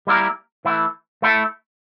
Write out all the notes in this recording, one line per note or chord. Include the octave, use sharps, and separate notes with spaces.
G3 A#3 E4 A#4
E3 A3 E4
A3 E4 A4